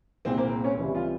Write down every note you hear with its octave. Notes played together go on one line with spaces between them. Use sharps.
C2 A#2 G#3 C4
A#3
C4
C#4
C#2 C3 E3 G3
F4